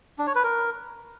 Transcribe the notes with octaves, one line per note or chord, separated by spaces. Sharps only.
D4
C#5
B4
A#4